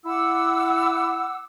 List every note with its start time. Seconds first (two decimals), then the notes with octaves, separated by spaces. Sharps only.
0.05 E4 F#5 D6 E6